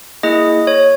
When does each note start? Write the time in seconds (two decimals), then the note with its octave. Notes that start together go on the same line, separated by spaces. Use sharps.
0.23 A#3 E4 G#4 D#5
0.67 C#5